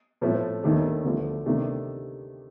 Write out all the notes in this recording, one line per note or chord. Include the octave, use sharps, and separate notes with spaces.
A2 F3 A3 C4
D#2 D#3 A3 D4
D2 D3 F3 A3
C3 D#3 A3 D4